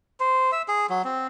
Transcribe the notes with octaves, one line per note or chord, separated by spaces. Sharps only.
C5
E5
G#4
F#3
C4